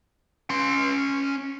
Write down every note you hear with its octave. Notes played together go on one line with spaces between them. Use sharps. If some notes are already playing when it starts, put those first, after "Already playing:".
C#4 C6